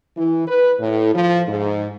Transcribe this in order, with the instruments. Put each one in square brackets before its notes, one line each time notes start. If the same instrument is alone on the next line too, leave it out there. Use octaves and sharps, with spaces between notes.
[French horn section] E3
B4
A2
F3
G#2